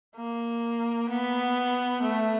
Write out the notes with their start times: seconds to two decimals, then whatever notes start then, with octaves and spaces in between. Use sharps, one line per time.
0.16 A#3
1.09 B3
2.03 A3